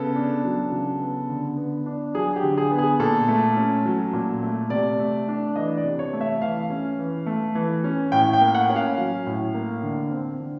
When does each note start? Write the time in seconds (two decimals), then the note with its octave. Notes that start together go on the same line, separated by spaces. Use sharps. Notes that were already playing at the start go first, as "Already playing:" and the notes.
Already playing: C#3 B3 A4
0.15 D4
0.44 F#3
0.72 C#3
1.01 B3
1.30 D3
1.57 B3
1.86 D4
2.14 F#3 G#4
2.36 G4
2.43 D3
2.58 G#4
2.71 B3
2.78 G#4
3.00 A#2 A4
3.28 A3
3.57 C#4
3.85 F#3
4.13 A#2
4.43 A3
4.70 C3 D5
4.99 A3
5.28 D4
5.56 E3 D#5
5.77 D5
5.84 C3
5.99 C#5
6.13 A3
6.21 E5
6.41 E3 F5
6.70 C#4
6.99 E3
7.26 A3
7.55 E3
7.84 C#4
8.12 A2 G5
8.33 G5
8.41 A#3
8.55 F#5
8.70 C#4
8.76 F5
8.98 F#3
9.27 A2
9.54 A#3
9.83 D3
10.11 C4
10.40 D3